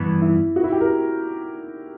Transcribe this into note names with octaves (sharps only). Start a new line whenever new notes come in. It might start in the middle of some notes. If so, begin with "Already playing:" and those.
Already playing: G2 E3 B3
E4
F#4
E4
G4
A#4